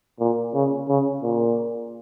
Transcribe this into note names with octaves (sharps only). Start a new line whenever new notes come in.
A#2
C#3
C#3
A#2